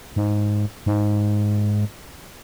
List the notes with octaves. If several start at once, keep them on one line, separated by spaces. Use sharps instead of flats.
G#2
G#2